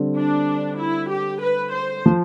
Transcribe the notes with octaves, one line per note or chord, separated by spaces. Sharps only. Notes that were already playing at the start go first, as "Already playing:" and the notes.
Already playing: D3 G3 C4
D4
E4
G4
B4
C5
F3